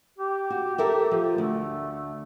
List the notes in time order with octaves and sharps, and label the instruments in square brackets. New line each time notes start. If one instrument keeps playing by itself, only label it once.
[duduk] G4
[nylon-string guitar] F#4
A4 A#4 E5
F3
[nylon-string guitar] D2 [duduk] A3